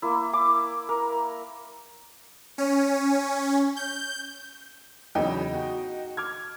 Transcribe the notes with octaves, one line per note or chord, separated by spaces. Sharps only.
A#3 E4
D6
A#4
C#4
G6
E2 C#3 F#3 D#4 G5
F#4
D6 F6 G#6